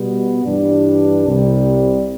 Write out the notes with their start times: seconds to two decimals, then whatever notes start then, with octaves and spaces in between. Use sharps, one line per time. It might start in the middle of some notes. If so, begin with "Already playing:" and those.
Already playing: B2 G3 B3
0.45 G2 E3 G3 D4
1.24 C2 C3 G3